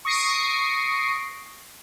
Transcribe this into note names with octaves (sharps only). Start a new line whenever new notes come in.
C#6 D#6 A#6 C7 D7